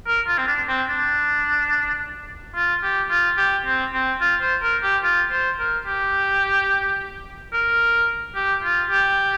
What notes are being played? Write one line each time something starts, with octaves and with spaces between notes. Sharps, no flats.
A#4
F4
C4
D4
C4
D4
F4
G4
F4
G4
C4
C4
F4
C5
A#4
G4
F4
C5
A#4
G4
A#4
G4
F4
G4